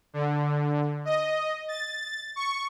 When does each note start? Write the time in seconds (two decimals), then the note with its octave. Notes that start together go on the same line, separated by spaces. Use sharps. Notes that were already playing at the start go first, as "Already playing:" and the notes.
0.14 D3
1.05 D#5
1.68 A6
2.36 C#6